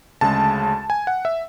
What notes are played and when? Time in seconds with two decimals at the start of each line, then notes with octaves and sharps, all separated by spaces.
0.21 D2 C#3 G#3 A5
0.90 G#5
1.07 F#5
1.25 E5